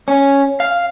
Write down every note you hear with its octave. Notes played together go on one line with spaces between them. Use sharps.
C#4
F5